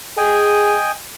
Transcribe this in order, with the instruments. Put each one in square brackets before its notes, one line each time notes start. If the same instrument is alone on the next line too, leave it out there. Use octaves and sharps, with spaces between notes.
[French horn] G#4 [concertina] D#5 G5 G#5